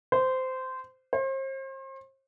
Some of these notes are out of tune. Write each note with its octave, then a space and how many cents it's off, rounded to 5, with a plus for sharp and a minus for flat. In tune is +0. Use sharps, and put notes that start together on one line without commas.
C5 -15
C5 +40